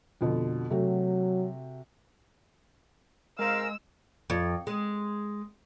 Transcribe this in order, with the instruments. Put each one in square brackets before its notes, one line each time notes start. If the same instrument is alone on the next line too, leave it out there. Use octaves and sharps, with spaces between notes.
[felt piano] F2 B2 D3
[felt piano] C3 A3 F#4 [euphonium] F#3
[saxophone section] G#2 C4 F5 [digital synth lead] G#3 [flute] A#4 [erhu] E6
[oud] F2
G#3